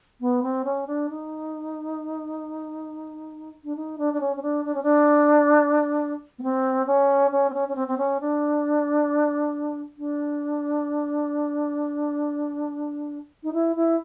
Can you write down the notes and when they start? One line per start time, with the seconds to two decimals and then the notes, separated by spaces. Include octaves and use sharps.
0.20 B3
0.42 C4
0.65 C#4
0.87 D4
1.09 D#4
3.64 D4
3.76 D#4
3.98 D4
4.13 D4
4.20 C#4
4.36 C#4
4.42 D4
4.65 D4
4.74 C#4
4.83 D4
6.38 B3
6.42 C4
6.87 C#4
7.31 C#4
7.50 C4
7.54 C#4
7.68 C#4
7.75 C4
7.88 C4
7.98 C#4
8.20 D4
9.98 D4
13.43 D#4
13.53 E4
13.76 E4